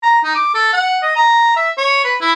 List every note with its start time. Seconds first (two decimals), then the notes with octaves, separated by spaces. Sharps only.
0.03 A#5
0.24 D#4
0.35 D6
0.55 A4
0.73 F#5
1.02 D#5
1.16 A#5
1.57 E5
1.78 C#5
2.04 B4
2.21 E4